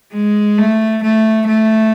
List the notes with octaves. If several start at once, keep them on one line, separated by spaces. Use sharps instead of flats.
G#3
A3
A3
A3